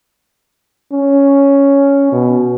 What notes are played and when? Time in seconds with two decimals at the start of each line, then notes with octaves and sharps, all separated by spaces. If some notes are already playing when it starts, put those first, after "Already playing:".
0.93 C#4
2.12 B2